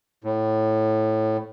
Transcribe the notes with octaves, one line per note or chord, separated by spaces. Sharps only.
A2